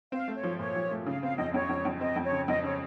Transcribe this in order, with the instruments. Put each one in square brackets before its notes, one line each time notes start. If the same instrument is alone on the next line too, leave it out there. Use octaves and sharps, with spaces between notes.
[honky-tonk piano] C4 [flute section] F5
[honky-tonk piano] A3
[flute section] C#5
[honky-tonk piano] F3
[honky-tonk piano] A#2 [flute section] C#5
[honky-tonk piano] F3
A3
[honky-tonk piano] C#3 [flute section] F5
[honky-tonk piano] C4 [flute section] F5
[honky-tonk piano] F2 [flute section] D#5
[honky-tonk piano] F2 [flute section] C#5
[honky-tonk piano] F2
F2
[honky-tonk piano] C4 [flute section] D#5
[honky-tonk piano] F2
[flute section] C#5
[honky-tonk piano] C#3
[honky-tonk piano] F2 [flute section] D#5
[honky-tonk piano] C#3 [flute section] C#5